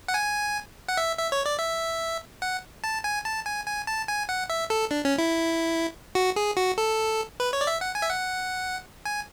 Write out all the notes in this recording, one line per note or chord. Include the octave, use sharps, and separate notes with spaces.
F#5
G#5
F#5
E5
E5
C#5
D5
E5
F#5
A5
G#5
A5
G#5
G#5
A5
G#5
F#5
E5
A4
D4
C#4
E4
F#4
G#4
F#4
A4
B4
C#5
D5
E5
F#5
G#5
E5
F#5
G#5